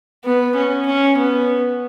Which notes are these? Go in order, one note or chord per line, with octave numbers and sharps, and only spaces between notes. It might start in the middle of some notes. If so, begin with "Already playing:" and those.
B3
C#4
C#4
B3